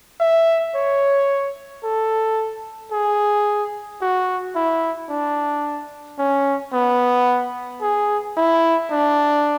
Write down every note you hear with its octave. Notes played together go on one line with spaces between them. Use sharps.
E5
C#5
A4
G#4
F#4
E4
D4
C#4
B3
G#4
E4
D4